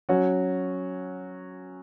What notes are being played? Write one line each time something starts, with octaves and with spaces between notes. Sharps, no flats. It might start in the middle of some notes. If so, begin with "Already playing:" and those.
F#3 C#4 F#4